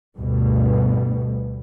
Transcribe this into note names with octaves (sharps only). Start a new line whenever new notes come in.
D2 G2 B2